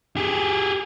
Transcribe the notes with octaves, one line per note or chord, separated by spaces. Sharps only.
G4 G#4